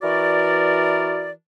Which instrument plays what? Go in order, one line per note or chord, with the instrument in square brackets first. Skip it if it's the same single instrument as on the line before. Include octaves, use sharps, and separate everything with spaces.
[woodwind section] E3 F#4 A#4 D5